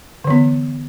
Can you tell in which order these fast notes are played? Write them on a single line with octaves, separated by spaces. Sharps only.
D3 E3 B3